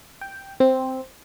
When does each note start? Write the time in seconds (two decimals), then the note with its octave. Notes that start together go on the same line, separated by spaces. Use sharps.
0.21 G5
0.60 C4